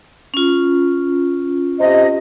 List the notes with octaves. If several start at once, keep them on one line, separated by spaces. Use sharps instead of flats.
C#4 F4
C3 G4 D#5